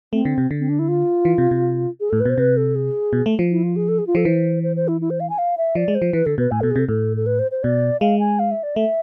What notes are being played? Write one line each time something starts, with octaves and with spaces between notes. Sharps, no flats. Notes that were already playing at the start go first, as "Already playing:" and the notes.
A3 C4
D3
C3
D3
C4
D4
E4
F4
E3
C3
C3
G#4
A2 A4
B4
B2 C5
C3 B4
A4
G#4
B2
A3
F3
E4
F4
G#4
A4
G#4
F4
F3 A4
E3 C5
C5
C5
E4
E4
C5
F5
G#5
F5
E5
F3 D5
G#3
C5
F3
E3 B4
D3 A4
B2 B4
A2 G#5
B2 A4
G#4
C3 A4
A2 A4
A4
B4
C5
C5
B2 D5
G#3 F5
G#5
F5
E5
D5
A3 E5